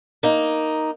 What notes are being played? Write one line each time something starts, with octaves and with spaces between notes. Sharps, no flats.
A#3 D#4